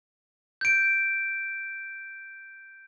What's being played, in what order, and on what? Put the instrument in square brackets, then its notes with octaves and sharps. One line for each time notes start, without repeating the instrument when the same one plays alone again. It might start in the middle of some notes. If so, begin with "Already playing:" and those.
[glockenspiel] G6 D7